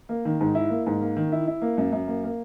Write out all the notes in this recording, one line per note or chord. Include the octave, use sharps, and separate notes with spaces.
A#3
D#3
G#2
E4
A#3
G#2
A#3
D#3
E4
E4
A#3
F#2
F#2
A#3
A#3